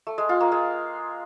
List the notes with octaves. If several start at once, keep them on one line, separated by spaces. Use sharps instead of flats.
A3
G#3
F4
A#3
G#3